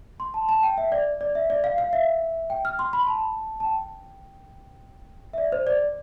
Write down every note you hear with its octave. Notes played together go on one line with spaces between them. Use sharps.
C6
A5
A5
G5
E5
D5
D5
E5
D5
F5
F5
E5
G5
F6
C6
B5
A5
A5
G5
E5
D5
C5
D5